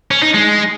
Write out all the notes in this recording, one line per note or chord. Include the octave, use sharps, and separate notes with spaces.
C#4
D#4
G#3